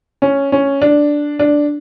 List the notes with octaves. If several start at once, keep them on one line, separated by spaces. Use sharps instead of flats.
C#4
C#4
D4
D4